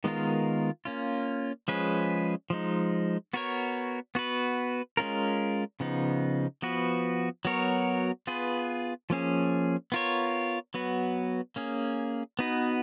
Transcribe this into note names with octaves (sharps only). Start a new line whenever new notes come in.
D#3 G#3 B3 F4 A#4
A#3 C#4 F4
F3 G#3 C#4 G#4 B4
F3 G#3 D#4
B3 F#4 A#4 C#5
B3 F#4 B4
G#3 C#4 F4 A#4
C#3 F3 B3 D#4
F3 B3 F#4 B4
F#3 B3 F#4 A#4 C#5
B3 F4 G#4 B4
F3 A#3 C#4 G#4
B3 F4 A#4 C#5
F#3 B3 F#4 B4
A#3 C#4 G#4
B3 D#4 F#4 B4